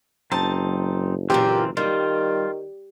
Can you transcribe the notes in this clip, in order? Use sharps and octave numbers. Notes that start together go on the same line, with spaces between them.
F#1 F#2 C4 D#4 A5
A#2 E3 A#3 C4 F4 G4
D#3 G3 F4